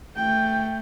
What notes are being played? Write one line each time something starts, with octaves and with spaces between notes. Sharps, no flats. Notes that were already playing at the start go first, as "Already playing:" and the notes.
A3 G5